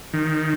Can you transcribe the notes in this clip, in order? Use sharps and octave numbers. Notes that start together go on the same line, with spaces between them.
D#3